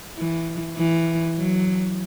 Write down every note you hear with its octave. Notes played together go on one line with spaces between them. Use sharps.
E3
E3
F#3